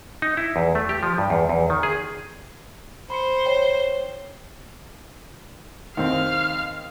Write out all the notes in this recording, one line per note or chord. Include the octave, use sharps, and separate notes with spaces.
D#4
E4
E2
A3
G4
F3
G2
E2
E2
D#3
G#4
C5 B5 C6 C#7
C#5 G5
D#2 C4 F5 F6